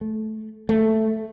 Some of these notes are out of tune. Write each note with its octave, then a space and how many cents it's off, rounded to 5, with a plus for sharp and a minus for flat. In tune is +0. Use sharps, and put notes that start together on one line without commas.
A3 -15
A3 +0